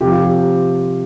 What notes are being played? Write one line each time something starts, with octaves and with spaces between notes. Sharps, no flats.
C3 F3 G4
F4
G4